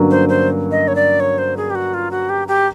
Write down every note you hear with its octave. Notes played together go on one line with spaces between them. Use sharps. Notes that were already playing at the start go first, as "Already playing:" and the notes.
Already playing: G2 D3 F#3 A#3 C#4
C5
C5
D#5
C#5
D5
C#5
C5
G#4
G4
F#4
F4
F#4
G4
G4